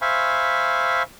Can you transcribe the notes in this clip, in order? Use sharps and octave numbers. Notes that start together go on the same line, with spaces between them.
C5 E5 F5 G#5 B5 C#6